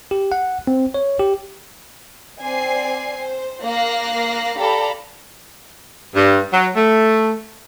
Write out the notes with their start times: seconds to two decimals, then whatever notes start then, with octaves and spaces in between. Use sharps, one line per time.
0.11 G4
0.32 F#5
0.67 C4
0.94 C#5
1.20 G4
2.41 C4 D5 G#5 C7
3.17 C5
3.63 A#3 F5 F#6 A#6 C7
4.58 G4 A4 D5 F5 A#5 B5
6.15 G2
6.53 F#3
6.76 A3